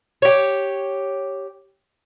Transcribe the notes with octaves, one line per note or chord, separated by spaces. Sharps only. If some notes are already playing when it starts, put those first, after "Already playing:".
G4 C#5